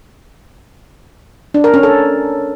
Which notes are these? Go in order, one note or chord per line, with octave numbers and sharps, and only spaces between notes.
D4
A#4
C#4
A4